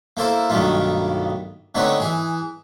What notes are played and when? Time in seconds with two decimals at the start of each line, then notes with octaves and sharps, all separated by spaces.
0.17 A#3 E4 A4 A#4 C5
0.50 B1 G2 D#3 A3 F4
1.75 D3 A3 C4 D#4 B4 C#5
2.00 E3 G#4